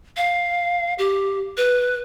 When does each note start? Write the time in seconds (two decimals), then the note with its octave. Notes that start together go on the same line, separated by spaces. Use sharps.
0.17 F5
0.98 G4
1.57 B4